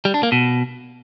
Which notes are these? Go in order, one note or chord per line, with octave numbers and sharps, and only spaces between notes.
G3
D4
A#3
B2